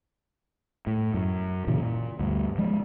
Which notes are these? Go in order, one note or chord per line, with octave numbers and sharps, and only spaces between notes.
A2
F#2
A#2 C#3 E3
A#2
D2 G2
F3 G#3